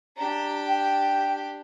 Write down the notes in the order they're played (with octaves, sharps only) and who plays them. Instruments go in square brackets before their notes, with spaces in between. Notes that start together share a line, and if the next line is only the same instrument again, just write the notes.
[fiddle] D4 G4 [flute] A#5
[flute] G5